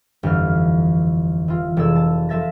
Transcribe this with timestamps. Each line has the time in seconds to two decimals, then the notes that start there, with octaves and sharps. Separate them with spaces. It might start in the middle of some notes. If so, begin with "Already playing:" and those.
0.23 G1 F2 E3 F6
1.48 E3 F4
1.77 F1 G#3 A4 E6 G#6
1.96 A5
2.29 F3 A4 E5 A6 A#6